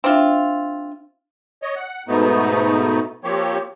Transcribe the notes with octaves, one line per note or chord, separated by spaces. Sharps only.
C4 D4 F4 E5
C#5 D#5
F#5
G#2 B2 A3 B3 D#4
F3 A#3 C4 G4 C#5